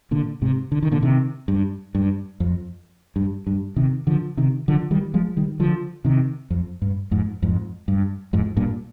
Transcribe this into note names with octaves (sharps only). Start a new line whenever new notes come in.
A#2 D3
G#2 C3
D3
D#3
A#2 D3
C3 D#3
G2
G2
F2
G2
G2
C3 D#3
D3 F3
C3 D#3
D3 F3
D#3 G3
F3 G#3
D#3 G3
D3 F3
C3 D#3
F2
G2
F2 G#2
F2 G#2
G2
F2 G#2
G2 A#2